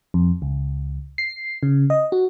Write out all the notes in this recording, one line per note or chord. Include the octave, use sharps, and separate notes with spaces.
F2
C#2
C7
C#3
D#5
F#4